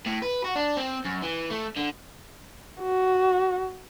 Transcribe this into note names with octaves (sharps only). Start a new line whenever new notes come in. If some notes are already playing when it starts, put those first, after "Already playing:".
A2
B4
F#4
D4
C4
F#2
E3
A3
D3
F#4